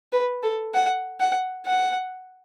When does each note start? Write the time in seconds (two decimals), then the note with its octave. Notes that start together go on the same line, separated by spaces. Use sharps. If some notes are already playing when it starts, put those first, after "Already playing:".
0.13 B4
0.43 A4
0.74 F#5
1.20 F#5
1.66 F#5